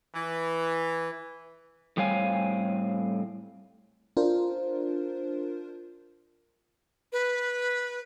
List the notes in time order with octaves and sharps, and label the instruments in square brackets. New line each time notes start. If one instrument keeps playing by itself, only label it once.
[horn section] E3
[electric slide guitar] A2 G3 C4 C#5 F5 G#5
[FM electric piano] D4 F4 A#4 C5
[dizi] B4